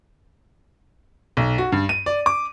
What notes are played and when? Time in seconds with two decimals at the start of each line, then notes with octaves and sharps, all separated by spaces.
1.37 B1
1.58 F#4
1.72 G2
1.89 D#7
2.06 D5
2.26 D6